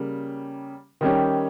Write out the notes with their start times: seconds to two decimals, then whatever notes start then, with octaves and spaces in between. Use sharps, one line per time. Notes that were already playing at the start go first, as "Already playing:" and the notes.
Already playing: C#3 G3 A#3
1.01 D#3 G3 C#4 G4